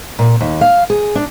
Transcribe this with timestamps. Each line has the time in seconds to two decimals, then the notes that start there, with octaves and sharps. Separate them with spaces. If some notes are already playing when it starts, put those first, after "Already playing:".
0.19 A#2
0.40 D#2
0.61 F5
0.90 G#4
1.15 D4